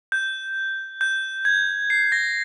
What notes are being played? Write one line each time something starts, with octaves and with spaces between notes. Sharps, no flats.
G6
G6
G#6
C7
A#6